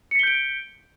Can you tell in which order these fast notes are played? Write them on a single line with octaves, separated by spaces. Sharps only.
C#7 B6 G7 G6 D7